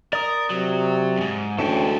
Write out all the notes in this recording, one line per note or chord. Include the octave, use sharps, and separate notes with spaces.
A#4 D5 D#6
C3 F#3
F2 G#2
D2 E3 G#3 C#4 A4 G5